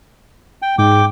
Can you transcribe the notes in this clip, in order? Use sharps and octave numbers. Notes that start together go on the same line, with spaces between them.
G5
G#2 G5 D6